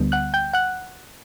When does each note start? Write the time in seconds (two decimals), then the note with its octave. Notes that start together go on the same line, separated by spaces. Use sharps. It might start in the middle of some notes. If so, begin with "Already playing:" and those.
Already playing: D2 D3 G3 B3
0.12 F#5 F#6
0.34 G5 G6
0.53 F#5 F#6